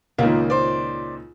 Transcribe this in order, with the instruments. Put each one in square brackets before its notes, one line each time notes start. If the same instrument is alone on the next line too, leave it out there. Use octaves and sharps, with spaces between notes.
[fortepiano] C#2 A#2 D#3 [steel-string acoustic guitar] A#3
[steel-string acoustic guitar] C5 D5